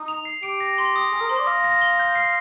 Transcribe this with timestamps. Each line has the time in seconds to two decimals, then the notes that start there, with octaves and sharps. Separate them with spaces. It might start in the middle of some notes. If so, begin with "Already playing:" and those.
Already playing: D#4
0.08 F7
0.25 C7
0.43 G4 D7
0.60 A#6
0.78 C6
0.96 D#6
1.12 G#4 D#6
1.21 A#4
1.29 C5 C6
1.38 D5
1.47 F5 A#6
1.64 A#6
1.82 G7
1.99 G6
2.15 C7